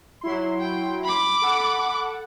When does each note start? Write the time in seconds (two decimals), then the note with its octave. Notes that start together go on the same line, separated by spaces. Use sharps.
0.21 F#3 E4 C6
0.60 G5
1.04 B5 D6
1.42 A4 F#5